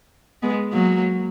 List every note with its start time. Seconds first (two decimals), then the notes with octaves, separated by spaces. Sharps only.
0.42 G#3 B3
0.72 F#3 A#3